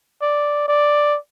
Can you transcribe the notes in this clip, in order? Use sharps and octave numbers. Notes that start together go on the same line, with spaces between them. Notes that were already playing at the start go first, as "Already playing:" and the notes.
D5
D5